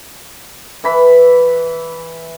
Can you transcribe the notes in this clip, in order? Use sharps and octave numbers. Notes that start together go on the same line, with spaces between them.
E3 B5